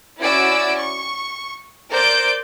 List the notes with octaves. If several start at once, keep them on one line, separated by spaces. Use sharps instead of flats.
C#4 E4 F#4 D5 E6 D7
C#6
A#4 C5 D5 G6 D7